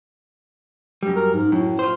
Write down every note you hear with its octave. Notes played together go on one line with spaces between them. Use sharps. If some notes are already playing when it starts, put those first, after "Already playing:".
F#2 G3
A#4
G#2
F#2 A2
F4 C5